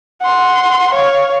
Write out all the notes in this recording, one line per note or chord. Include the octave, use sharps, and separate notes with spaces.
F#5 C6
C#5 F5